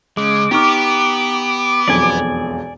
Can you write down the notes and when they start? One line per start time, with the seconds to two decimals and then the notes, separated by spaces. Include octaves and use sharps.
0.17 C#3 G#3 D6
0.51 B3 D#4 G4 C#6 F6
1.88 E1 B1 F2 D5 G#5